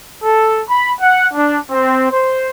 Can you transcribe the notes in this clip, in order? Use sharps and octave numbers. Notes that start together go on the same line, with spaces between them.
A4
B5
F#5
D4
C4
C5